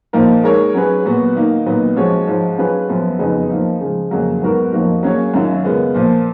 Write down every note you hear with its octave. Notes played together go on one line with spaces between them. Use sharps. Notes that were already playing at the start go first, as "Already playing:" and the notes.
A#2 F3 A#3 D#4 A#4
G#3 D#4 A#4 C#5
F#3 C#4 G#4 B4
A#2 F#3 B3 F#4
D#3 A#3 D#4
A#2 F#3 B3 D#4
F3 G#3 C#4 F#4 C#5
G#2 F3 G#3
F#3 C#4 F4 G#4 B4
F#2 F3 B3
F2 C#3 F#3 B3 D#4
F3 A#3 D#4
C#3 F3 G#3
F2 C#3 F#3 A#3
G#2 F#3 B3 F#4 A#4
F2 F3 A#3 D#4 F#4
F#3 A#3 C#4 G#4 C#5
F#2 D#3 F#3 C#4 F4
C#3 G#3 B3 F4 A#4
A#2 F3 A#3